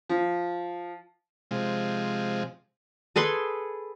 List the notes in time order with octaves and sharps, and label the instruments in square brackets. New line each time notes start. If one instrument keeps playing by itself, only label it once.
[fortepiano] F3
[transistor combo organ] C3 F3 G#3
[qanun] G#4 A4 B4 C6